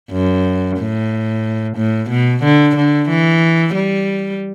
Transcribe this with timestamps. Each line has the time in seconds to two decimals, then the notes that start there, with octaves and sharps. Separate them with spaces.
0.12 F#2
0.78 A2
1.77 A2
2.10 B2
2.44 D3
2.76 D3
3.09 E3
3.75 G3